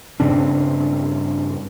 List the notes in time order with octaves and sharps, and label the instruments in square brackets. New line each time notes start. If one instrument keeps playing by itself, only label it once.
[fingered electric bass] G2 C#3 C4 D4